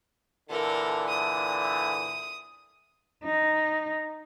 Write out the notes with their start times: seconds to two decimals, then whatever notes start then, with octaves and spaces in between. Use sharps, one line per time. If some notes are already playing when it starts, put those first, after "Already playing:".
0.49 A#2 D3 E3 A4 A#4
1.09 D#6
3.24 D#4